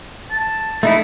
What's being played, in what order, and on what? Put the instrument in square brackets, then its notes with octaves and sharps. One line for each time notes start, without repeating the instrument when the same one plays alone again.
[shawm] A5
[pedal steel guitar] A3 D#4 E4